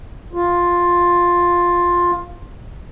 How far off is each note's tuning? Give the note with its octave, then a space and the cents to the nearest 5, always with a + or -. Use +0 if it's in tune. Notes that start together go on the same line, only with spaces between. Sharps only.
F4 +10